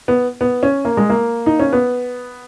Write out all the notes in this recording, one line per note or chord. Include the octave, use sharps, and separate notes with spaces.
B3
B3
C#4
A#3
G#3
A#3
D#4
C#4
B3